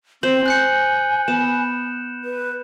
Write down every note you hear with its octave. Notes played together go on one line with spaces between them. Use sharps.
C4 C5 F#7
G#5 F#6 G6 C#7
B3 E7
B4